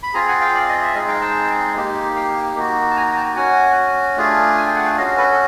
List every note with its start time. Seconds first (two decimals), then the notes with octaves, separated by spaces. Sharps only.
0.03 B5
0.14 C4 F4 G#4 G#5 A#5
0.28 F#5 G#5
0.41 F5 G5
0.54 D5
0.68 D#5
0.82 E5
0.94 G#3 C4 D#4 G#4 D#5 F5
1.08 F5 G5
1.21 G5 A5
1.76 A#3 D#4 G4
2.16 F5 G5
2.56 A#3 D#4 F#4
2.91 A5
2.96 G#5 A#5
3.10 A#5
3.16 G5 A5
3.36 C#4 F#4 F#5 G#5
4.17 A3 D4 F4 G#4
4.57 G#5
4.66 G5
4.76 F#5
4.84 F5 G5
4.98 C#4 F#4 D#5 F5
5.17 A4 B4
5.32 A4